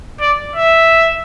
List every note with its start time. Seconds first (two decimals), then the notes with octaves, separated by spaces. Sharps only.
0.21 D5
0.56 E5